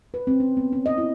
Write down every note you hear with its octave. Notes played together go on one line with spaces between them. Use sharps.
B4
C4
C#4
B3
C#4
D#5
E4